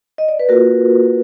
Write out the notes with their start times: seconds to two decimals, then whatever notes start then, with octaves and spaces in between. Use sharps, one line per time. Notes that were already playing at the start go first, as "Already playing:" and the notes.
0.18 D#5
0.29 D5
0.39 B4
0.49 A#3 F4 F#4 A#4